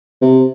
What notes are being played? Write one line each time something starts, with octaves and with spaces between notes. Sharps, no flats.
C3